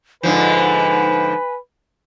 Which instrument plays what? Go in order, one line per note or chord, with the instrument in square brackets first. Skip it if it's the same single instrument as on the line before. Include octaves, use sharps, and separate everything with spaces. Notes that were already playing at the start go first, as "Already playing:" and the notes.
[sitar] G#2 D3 F3 [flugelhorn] B4 [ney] G#5